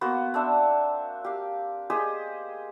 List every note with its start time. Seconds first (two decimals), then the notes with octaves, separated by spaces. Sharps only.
0.01 A#3 B3 F#4 C5
0.34 C4 D4 E5
1.24 G4 F5
1.90 G4 G#4 C5 D#5